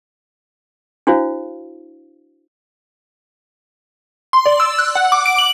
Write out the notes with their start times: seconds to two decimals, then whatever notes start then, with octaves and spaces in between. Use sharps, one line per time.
1.07 D4 E4 F#4 C5 F5
4.33 C6
4.46 D5
4.60 E6
4.79 F#6
4.95 F#5
5.12 D6
5.26 D7
5.38 F#7